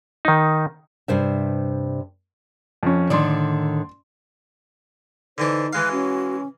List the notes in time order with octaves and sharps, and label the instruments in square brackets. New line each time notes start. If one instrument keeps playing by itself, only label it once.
[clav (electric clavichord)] D#3 D#4
[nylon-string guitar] G2 C3 C5 E5
[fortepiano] F2 C#4
[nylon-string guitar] A2 D3 D#3 [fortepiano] D5 C6
[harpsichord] D3 E3 D4 [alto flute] D#4 [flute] C5
[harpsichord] E3 G#3 F5 [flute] F#6
[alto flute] C#4 [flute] F#4